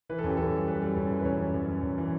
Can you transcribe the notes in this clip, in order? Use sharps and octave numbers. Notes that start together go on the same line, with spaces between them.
E3 B4
A4
F#2 G4
F#2 A4
G3
F#2 B4
G3
F#2
E3
B4
F#2 C#5
F#2
F#2
F#2
F#2
E3